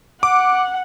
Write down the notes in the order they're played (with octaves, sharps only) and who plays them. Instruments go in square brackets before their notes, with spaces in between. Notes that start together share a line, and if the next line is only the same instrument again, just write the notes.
[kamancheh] F#5 [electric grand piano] D6